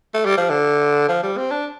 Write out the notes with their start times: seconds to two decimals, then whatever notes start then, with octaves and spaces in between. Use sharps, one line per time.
0.14 A3
0.25 G3
0.37 F3
0.50 D3
1.09 F3
1.23 G3
1.37 C4
1.51 D4